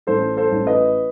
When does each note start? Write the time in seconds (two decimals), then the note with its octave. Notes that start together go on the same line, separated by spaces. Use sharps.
0.07 A1 A4 C5
0.37 A4 C5
0.52 A1
0.67 B4 D#5